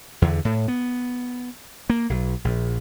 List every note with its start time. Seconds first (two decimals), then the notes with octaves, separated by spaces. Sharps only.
0.22 E2 D3
0.45 A2
0.68 B3
1.90 A#3
2.10 B1
2.45 A#1